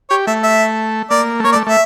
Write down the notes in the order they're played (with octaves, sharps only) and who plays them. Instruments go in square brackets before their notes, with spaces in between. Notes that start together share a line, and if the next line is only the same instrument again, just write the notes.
[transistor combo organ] G4 [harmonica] C#5
[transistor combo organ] A3 [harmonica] E5
[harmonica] E5
[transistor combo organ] A#3 [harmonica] D5
[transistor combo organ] A3
[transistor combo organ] A#3 [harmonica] C#5
[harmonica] D5
[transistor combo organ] A3
[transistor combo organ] A3 [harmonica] E5